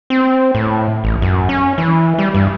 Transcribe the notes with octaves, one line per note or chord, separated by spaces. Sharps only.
C4
A2
A1
F#2
C#4
E3
G3
G2